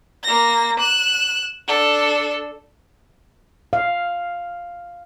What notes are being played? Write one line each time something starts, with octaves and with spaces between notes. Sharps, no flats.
A#3 A#6
F#6 E7
D4 A4
F5